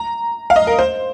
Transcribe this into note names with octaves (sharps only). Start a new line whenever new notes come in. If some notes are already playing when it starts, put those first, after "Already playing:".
Already playing: A#5
F5
D#5
A#4
C5